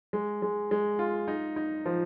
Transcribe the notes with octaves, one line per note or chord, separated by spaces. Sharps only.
G#3
G#3
G#3
F4
D#4
D#4
F3